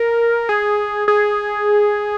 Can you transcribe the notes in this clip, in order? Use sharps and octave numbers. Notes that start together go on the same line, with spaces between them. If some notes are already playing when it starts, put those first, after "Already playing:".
Already playing: A#4
G#4
G#4